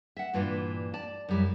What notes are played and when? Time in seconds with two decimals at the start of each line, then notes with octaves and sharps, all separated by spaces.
0.17 E5 F#5
0.33 G2 A#2 E3 D4 F4
0.94 D5 A5
1.29 F#2 C#3 G3 E4